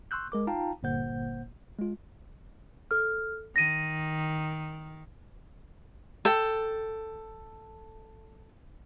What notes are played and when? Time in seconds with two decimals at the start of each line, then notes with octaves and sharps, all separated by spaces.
0.11 C6 C#6 E6 F#6 G6
0.32 G#3 A#4 D6
0.47 D#4 F4 F5 G5 A5 A#5
0.83 G1 A#2 A#3 C5 F#5 G6
1.79 G#3 F4
2.91 A4 F6
3.56 D#3 A#6 D#7
6.25 A4 G5